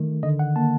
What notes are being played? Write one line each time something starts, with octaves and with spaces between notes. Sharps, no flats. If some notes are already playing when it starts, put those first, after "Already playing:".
Already playing: D#3 A3
D3 D#5
F#5
A#3 A5